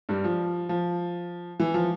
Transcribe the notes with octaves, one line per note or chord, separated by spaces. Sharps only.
G2 G3
F3
F3
E3
F3